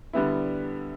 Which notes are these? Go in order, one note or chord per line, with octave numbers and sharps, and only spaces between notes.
D3 G3 B3 E4